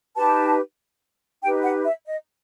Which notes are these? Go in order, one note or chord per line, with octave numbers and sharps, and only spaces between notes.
D#4 G4 B4 A5
D#4 G4 B4 G5
F#5
E5
D#5